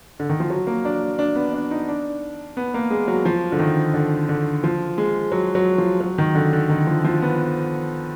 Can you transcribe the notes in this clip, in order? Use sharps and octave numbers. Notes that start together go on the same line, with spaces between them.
D3
D#3
F3
F#3
A#3
D4
D4
B3
D4
D#4
D4
B3
A#3
G#3
F#3
F3
D3
D#3
D3
D3
F3
G#3
F#3
F#3
F3
F#3
D#3
D3
D3
D#3
F3
F3
B3